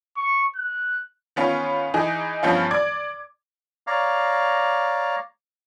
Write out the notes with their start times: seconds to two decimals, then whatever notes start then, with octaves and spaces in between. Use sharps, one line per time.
0.17 C#6
0.55 F#6
1.36 D#3 B3 C#4 F4
1.94 E3 D#4 G#4
2.43 G2 F3 B3 C#4 F4
2.71 D5 D6 G#6
3.87 C#5 D5 F5 A#5